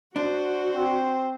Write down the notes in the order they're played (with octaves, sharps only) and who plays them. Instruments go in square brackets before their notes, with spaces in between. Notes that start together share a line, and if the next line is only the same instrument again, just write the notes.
[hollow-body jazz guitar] D4 [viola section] F#4 [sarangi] C5
[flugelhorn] C4